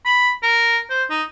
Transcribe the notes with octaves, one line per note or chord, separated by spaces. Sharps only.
B5
A#4
C5
D#4